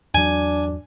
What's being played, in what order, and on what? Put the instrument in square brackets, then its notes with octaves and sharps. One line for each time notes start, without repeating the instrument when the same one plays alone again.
[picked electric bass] E2 F#3 [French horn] D4 [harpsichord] G#5